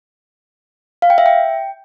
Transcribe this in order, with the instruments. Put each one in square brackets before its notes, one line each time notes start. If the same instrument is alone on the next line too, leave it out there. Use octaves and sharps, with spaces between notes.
[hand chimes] F5
G5
E5
G5